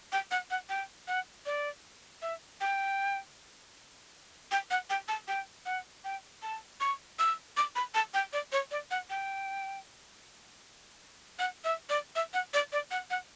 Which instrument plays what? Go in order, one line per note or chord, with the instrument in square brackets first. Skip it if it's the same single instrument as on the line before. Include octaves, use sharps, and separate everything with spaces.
[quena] G5
F#5
F#5
G5
F#5
D5
E5
G5
G5
F#5
G5
A5
G5
F#5
G5
A5
C#6
E6
D6
B5
A5
G5
D5
C#5
D5
F#5
G5
F#5
E5
D5
E5
F#5
D5
D5
F#5
F#5